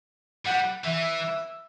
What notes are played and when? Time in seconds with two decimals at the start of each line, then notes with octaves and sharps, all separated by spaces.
0.46 G3 F#5
0.84 E3 E5
1.23 E5